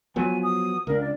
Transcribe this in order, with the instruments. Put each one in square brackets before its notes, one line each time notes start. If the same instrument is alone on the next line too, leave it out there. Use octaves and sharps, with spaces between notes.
[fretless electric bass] F3 F#3 B3 [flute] G#5
[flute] D#6
[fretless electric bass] C#2 D4 [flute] A#4
[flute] D5